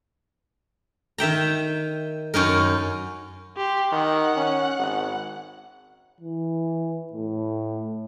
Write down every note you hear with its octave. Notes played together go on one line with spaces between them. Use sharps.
D#3 E5 G5 A#5
F#2 C#4 D#4 A#4
G4 C6
D#3 F#5
C#4
G#1
E3
A2